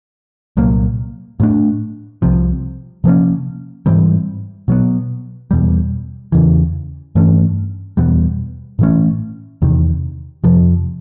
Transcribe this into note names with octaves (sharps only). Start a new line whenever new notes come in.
C2 A#2 F#3 A#3
A2 F3 A3 D4
C2 C3 F3
C3 F3 A#3 C#4
G#2 E3 G3 C4
B2 F#3 B3
E2 B2 G3
E2 C#3 E3
G2 E3 A3 C#4
E2 B2 G3 B3
A2 E3 A3 C#4
E2 C3 D#3
F2 C3 F3